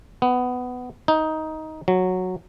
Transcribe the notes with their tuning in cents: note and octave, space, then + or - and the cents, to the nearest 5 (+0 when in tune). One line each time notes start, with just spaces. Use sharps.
B3 +15
D#4 +10
F#3 -5